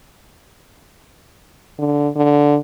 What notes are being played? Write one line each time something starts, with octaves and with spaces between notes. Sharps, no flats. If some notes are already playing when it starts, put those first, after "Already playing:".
D3
D3